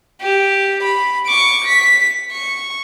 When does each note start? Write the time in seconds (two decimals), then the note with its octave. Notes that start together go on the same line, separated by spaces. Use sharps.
0.21 G4
0.84 B5
1.27 C#6 D6
1.65 B6
2.32 C#6